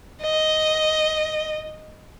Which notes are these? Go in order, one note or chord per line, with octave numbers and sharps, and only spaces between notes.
D#5